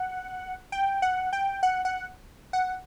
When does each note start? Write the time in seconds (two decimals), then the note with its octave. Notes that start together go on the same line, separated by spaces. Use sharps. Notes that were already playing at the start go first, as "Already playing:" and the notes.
Already playing: F#5
0.72 G5
1.02 F#5
1.33 G5
1.63 F#5
1.85 F#5
2.53 F#5